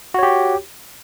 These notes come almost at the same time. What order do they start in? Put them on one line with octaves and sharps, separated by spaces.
F#4 C#5 G4